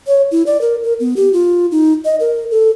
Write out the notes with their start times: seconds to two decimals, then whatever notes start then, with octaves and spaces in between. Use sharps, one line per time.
0.07 C#5
0.31 E4
0.46 D5
0.61 A#4
0.84 A#4
1.00 B3
1.16 G4
1.33 F4
1.71 D#4
2.05 D#5
2.20 A#4
2.51 A4